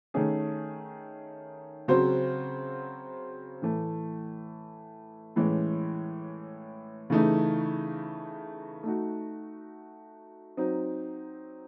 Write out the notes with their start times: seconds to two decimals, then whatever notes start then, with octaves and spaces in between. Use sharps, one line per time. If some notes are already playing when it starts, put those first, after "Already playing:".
0.14 D#3 A3 C#4 G#4
1.88 C#3 F#3 C4 F#4 C5
3.62 A2 E3 A3
5.36 A2 E3 G#3 C#4
7.10 C#3 E3 A3 D#4
8.83 A3 D#4 F#4
10.57 F#3 C4 D#4